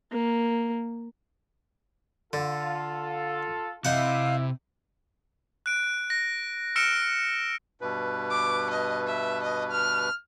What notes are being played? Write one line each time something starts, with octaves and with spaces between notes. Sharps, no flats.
A#3
D3 F4 A4
C3 D#4 E4 F5 F#5
F#6 D7
A#6
E6 F6 A#6 C#7 D7 E7
G2 B2 B4
D6
D#5
E5
D#5
F6